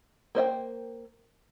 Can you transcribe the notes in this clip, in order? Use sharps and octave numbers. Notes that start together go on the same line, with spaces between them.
A#3 C5 D#5 G5